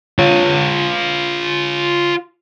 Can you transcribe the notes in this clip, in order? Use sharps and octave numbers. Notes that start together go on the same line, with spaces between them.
F4 C#5